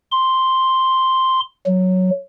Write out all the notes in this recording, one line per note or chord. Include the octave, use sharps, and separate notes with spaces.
C6
F#3